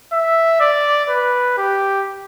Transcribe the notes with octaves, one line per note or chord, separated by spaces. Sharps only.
E5
D5
B4
G4